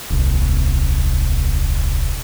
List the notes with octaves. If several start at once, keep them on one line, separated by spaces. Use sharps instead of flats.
D#1 C2